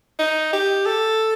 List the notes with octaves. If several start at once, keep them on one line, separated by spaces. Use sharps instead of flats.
D#4
G4
A4